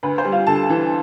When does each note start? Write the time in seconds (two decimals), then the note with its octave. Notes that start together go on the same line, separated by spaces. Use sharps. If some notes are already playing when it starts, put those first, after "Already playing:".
0.03 D2 B4
0.18 C5
0.25 G3
0.32 F4 F5
0.47 D2 A4 A5
0.69 E3